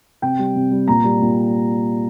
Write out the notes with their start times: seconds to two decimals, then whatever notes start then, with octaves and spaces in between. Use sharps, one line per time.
0.22 C3 G5
0.39 G3
0.56 C3
0.71 G3
0.88 A#2 A#5
1.04 G3
1.22 A#2